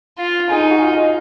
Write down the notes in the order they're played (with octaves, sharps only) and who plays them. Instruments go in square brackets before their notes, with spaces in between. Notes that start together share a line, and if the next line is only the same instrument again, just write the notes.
[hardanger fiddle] F4
[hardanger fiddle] D#4 [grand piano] G#4 G#5
[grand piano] G#4 G#5
F#4 F#5
F4 F5
D#5
F5